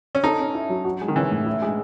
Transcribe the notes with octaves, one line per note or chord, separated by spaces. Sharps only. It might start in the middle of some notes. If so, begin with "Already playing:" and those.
C#4
D#4 A4
C#4
E4
F#3
F#4
G#3
D#3
E3 C#4
A2
E4
G#3